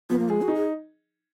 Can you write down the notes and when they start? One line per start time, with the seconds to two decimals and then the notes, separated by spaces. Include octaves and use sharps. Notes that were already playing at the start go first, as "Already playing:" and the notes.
0.10 F3 B3
0.19 A#3
0.29 G#3 G#4
0.42 F#4
0.48 D#4
0.55 G#4